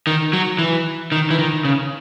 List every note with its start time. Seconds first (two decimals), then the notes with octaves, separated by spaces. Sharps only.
0.07 D#3
0.33 F#3
0.59 E3
1.12 D#3
1.30 E3
1.39 D#3
1.65 C#3